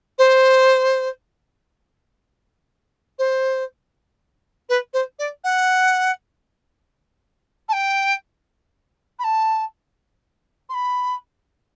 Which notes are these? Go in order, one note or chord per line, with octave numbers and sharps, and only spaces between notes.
C5
C5
B4
C5
D5
F#5
A5
G5
B5
A5
C6
B5